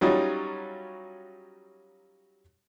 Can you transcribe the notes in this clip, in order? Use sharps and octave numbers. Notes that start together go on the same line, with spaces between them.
F#3 G3 C#4 D#4 F4